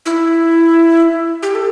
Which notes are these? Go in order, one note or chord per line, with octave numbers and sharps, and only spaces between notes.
E4
G4
A4